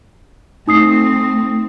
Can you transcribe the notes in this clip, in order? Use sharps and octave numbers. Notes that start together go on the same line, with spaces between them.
A3 C4 D#4 D#6 C7